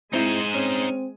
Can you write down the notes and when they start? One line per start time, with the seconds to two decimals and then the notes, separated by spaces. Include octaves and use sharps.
0.13 G#3 C4 D#4 E4 C5 G#5
0.54 C4 C#4